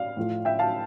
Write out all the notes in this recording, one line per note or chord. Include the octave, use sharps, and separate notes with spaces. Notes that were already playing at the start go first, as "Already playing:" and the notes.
Already playing: D5 F5
A2 F3 A3
E5 G5
F5 A5